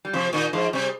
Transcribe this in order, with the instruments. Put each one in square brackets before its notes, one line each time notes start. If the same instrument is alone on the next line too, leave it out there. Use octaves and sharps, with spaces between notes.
[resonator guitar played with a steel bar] G3
[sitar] C3 [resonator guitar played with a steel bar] F3
[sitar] A#2 [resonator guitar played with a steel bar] D#3
[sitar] G#2 [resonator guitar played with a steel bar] F3
[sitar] C3 [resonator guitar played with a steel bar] G3